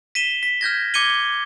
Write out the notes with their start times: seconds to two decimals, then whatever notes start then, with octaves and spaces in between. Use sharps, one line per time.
0.15 B6 D#7 E7 G7
0.43 B6
0.61 F6 G6 G#6 A#6
0.94 D6 G#6 C#7 D#7 G7